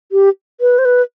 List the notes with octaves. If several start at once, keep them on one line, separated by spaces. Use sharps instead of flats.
G4
B4
C5
B4